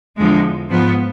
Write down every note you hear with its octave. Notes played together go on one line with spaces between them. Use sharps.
E2 D3 F3 G#3
G#2 F3 B3